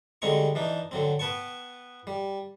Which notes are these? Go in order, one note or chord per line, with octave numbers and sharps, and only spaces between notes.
D3 G3 G#3 C4 A#5 C#6
E3 D4 D#4
D3 F#3 C4
B3 B4 G5 A5 C#6
G3